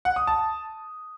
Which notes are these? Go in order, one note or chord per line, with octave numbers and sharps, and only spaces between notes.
F#5
D#6
A5